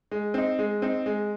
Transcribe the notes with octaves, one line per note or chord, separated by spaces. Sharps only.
G#3
C4 D#4
G#3
C4 D#4
G#3